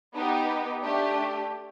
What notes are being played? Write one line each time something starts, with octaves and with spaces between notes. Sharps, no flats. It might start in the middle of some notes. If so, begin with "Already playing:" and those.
B3 D#4 G4
A3 D4 G4